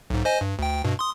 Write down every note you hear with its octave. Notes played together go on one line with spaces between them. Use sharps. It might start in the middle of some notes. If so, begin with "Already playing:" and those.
B1 G#2
C5 D#5 G#5
G2
D2 G5
G2 B2
C6 D#6